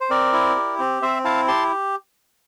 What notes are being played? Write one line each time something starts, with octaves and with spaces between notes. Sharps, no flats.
C5
C4 A#4 D5
E4
G4
C4
C4 C5 E5
E4 F5 A5
G4 A5 C6